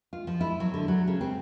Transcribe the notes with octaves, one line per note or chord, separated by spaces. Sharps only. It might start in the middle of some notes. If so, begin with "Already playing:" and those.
F4
F3
E4
F#3
D3
F#3
C#3
C4